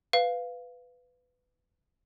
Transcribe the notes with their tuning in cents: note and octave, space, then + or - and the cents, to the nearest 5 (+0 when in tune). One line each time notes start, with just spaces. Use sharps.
B4 +15 F5 +0